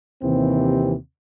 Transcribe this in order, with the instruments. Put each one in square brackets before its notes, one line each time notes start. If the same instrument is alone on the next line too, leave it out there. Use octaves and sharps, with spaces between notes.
[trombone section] D#2 C3 E3 C4